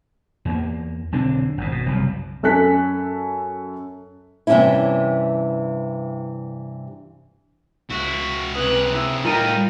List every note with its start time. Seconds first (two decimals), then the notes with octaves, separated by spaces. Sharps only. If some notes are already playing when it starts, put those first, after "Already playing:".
0.45 E2 A#3
1.12 B1 D3 C4 D4
1.58 G#1 F2 G#2
1.72 B2
1.86 F#1 C2 F#2
2.43 F#2 A4 G#5 F#6 B6
4.47 G2 C3 E3 C#4 D4 E4
7.90 C#2 E4 F#4
8.54 C3 G#4 B4 F#6
8.93 E4
9.24 A2 G3 D#4 F4 A#4 G5 A#5 D#7